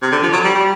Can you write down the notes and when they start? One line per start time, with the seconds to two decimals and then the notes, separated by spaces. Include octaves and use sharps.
0.02 C3
0.12 D3
0.22 F3
0.33 F#3
0.44 G3
0.54 G3